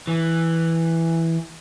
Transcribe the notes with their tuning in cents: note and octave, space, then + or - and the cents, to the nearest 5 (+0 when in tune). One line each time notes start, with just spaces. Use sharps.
E3 +0